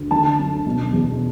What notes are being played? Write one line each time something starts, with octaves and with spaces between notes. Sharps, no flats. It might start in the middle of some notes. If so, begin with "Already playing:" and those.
Already playing: D2
D3 A5
F#2
B2
E2